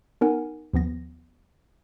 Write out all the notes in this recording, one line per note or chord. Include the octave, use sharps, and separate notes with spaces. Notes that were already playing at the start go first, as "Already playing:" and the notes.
B3 D#4 A#4 F#5 G#5
D#2 F3 B3 A#6